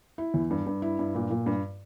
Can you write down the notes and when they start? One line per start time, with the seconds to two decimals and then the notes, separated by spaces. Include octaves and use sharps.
0.18 E4
0.34 E2
0.50 G2
0.66 G2
0.82 E4
0.99 G2
1.15 A#2
1.30 A#2
1.46 G2